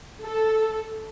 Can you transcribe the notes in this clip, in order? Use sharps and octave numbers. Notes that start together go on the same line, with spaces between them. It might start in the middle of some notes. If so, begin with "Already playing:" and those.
A4